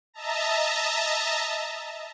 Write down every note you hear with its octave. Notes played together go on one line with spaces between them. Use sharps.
D#5 E5 A5 A#5